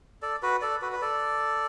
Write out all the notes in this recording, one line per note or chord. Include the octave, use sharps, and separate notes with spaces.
A4 D5
F#4 B4
A4 D5
F#4 B4
B4
A4 D5